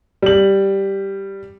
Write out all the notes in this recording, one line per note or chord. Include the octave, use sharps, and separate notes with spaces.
G3 F#7